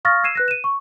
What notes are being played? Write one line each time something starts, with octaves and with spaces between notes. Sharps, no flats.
F5 C#6 D#6 F6 A6 A#6
E6 G#6 C7 D#7 E7
B4 F#6 A#6
D#7 E7
C#6